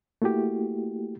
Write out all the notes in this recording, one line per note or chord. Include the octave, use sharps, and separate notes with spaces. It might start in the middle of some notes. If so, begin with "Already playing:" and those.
A3 A#3 E4 F#4 G4